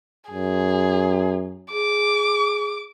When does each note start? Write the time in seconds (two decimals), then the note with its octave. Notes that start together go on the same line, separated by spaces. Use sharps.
0.31 F#2 G#4
1.73 G#4 D6